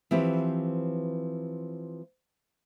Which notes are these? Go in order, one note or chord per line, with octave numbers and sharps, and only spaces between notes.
E3 F3 C4 G4 B4